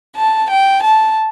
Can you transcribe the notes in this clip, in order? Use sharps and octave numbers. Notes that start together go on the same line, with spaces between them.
A5
G5
A5